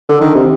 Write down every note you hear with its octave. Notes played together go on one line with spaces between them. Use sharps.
D3
D#3
C3